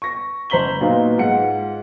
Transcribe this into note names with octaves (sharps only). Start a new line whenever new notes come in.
C#6 A#6
F#1 C5 A#5 B6 F#7 G7
A#2 F#3 B3 D#4 F4
G#2 F4 F#5 C#7